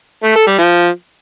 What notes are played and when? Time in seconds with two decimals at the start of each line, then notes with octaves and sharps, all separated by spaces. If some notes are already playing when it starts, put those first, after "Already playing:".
0.24 A3
0.35 A4
0.47 G3
0.59 F3